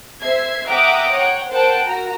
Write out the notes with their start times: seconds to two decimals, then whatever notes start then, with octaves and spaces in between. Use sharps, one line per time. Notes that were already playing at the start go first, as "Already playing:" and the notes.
0.21 C5 E5 G#6 C7
0.66 E5 F#5 G5 A#5 D6 D#6
1.13 C#5 F#5 G5
1.50 A#4 C5 F#5 G5 A5
1.82 F#4 A#4 A#5